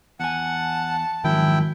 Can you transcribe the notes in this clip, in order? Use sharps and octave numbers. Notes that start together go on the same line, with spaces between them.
E2 F#5 G#5 A5
F2 G#2 D#3 F#3 E4 G5